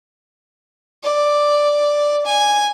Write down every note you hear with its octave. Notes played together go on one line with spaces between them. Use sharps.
D5
G#5